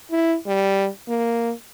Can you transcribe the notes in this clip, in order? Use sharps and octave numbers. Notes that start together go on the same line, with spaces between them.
E4
G3
A#3